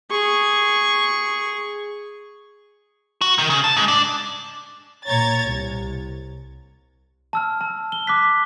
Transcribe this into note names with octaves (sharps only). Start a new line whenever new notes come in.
G#4 C#6
F#4
D#3
C#3
A5
G#2
D4
A#2 C#5 A#5 G#6 A6
C2
A5 E6 F6
A5
G7
D6 F#6 B6